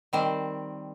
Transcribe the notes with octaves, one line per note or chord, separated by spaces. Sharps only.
D#3 G3 C4 C5